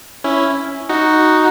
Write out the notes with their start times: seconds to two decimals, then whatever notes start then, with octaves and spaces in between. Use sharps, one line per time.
0.24 C#4 E4
0.89 D#4 F#4